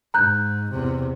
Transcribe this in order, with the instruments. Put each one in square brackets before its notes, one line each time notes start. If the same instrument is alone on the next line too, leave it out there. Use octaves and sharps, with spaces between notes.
[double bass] G#2 [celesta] A#5 F#6 G6
[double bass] E2 C3